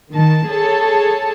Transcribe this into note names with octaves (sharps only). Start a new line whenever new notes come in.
D#3 A5
G#4 A4 C#5 A5